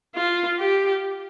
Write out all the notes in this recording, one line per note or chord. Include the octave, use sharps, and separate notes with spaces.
F4
G4